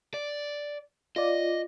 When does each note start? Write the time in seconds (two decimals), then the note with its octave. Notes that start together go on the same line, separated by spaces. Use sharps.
0.14 D5
1.16 F4 D5 D#5